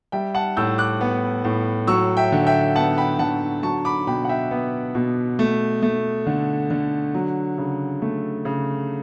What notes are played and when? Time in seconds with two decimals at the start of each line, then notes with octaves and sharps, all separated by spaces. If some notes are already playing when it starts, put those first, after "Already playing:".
0.12 G3 E5 G5
0.35 F#5 A5
0.57 A2 E6 G6
0.78 D6 F#6
1.01 B3
1.45 A2
1.87 F#3 C#6 E6
2.17 E5 G5
2.32 D3
2.47 E5 G5
2.76 B3 F#5 A5
2.98 G5 B5
3.19 D3 F#5 A5
3.63 F#3 A5 C#6
3.85 B5 D6
4.07 B2 G5 B5
4.25 F#5
4.29 E5 G5
4.51 B3
4.95 B2
5.39 A3
5.82 A3
6.26 D3
6.70 D3
7.14 F#3
7.58 C#3
8.02 A3
8.45 C#3